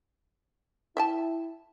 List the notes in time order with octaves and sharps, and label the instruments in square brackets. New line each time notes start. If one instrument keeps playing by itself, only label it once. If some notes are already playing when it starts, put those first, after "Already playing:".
[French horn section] E4 [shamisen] E5 G5 A5